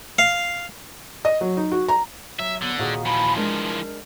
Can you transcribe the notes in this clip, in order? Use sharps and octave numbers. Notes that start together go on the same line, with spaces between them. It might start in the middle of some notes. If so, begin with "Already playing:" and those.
F5
D#5
F#3
D#4
F#4
A#5
F#3 E5
D3 B3
D#2 A#2 F#4 G#4
E3 F3 B5
G#3 D4 A#4